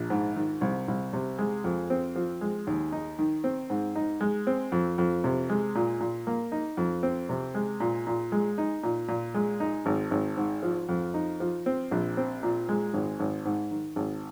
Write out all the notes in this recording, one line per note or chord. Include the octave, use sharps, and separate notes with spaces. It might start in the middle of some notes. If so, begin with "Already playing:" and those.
Already playing: A#1
G#2
D#3
C2
C2
C3
G#3
F2
C4
F3
G#3
D#2
D#4
D#3
C4
G#2
D#4
G#3
C4
F2
F2
C3
G#3
A#2
A#2
A#3
D#4
F2
C4
C3
G#3
A#2
A#2
G#3
D#4
A#2
A#2
G#3
D#4
G#1
G#1
G#2
F3
F2
D#4
F3
C4
A#1
C4
A#2
G#3
G#1
G#1
G#2
D#3
G#1